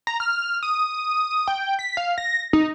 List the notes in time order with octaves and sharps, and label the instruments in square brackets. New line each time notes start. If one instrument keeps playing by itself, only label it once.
[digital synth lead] A#5
F6
D#6
G5
B6
F5
A#6
D#4